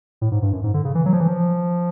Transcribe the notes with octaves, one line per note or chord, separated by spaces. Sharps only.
A2
G#2
G2
F#2
G#2
D3
C#3
E3
F#3
F3
E3
F3